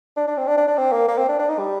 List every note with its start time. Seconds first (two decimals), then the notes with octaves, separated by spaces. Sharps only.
0.17 D4
0.27 D4
0.37 C4
0.47 D4
0.57 D4
0.67 D4
0.78 C4
0.92 A#3
1.08 A#3
1.18 C4
1.28 D4
1.39 D4
1.49 D#4
1.59 G3